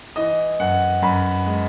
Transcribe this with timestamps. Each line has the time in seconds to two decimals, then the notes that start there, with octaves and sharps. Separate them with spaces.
0.16 E3 D#5
0.60 F#2 F#5
1.02 F#2 B5
1.46 G#3